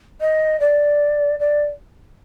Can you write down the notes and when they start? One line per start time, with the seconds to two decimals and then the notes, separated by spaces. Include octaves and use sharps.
0.21 D#5
0.60 D5
1.39 D5